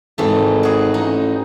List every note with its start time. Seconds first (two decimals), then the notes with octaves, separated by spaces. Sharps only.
0.18 G#1 G#2 E3 A3
0.63 F#4 G#4
0.94 A1 D#4